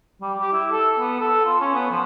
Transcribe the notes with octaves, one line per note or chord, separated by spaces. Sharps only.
G3
G4
E4
A4
B3
A4
F4
C#4
B3
F3